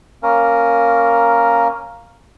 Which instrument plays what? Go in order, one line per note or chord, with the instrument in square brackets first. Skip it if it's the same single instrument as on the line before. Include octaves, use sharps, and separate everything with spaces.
[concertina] A#3 C#4 A#4